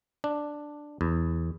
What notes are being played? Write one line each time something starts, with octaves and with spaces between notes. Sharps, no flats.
D4
E2